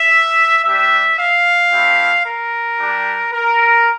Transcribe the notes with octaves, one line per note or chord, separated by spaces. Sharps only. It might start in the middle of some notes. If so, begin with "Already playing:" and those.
Already playing: E5
G3 D4 G4 E5
F5
A3 C4 E4 G4
A#4
G3 D4 G4
A#4